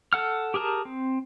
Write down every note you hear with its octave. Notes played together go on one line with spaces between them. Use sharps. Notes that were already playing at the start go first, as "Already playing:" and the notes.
A4 F#5 F6
G4 G#4 A#4 A5 A#5
C4